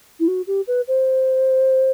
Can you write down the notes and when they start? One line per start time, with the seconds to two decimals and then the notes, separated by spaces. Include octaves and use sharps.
0.20 E4
0.28 F#4
0.47 G4
0.67 B4
0.88 C5